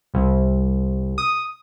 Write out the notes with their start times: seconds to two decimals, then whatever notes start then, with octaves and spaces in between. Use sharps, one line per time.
0.14 C2
1.18 D#6